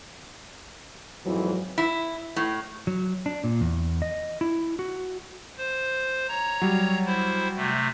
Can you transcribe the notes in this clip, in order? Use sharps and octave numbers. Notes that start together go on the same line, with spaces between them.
F2 G#2 E3 F#3
E4
A2
F#3
D4
A#2
E2
D#5
E4
F#4
C5
C#5 A#5
F#3 G3
E4 C5
C3 A3